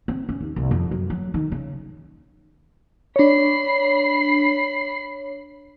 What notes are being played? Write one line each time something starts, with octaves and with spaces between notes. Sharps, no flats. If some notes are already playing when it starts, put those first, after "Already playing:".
C4
C#4
D#2
C2
F2
F#2
F#3
D#3
C#3
D4 C#5 B5 C7